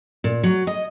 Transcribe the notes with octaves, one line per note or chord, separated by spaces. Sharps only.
A#2
F#3
D#5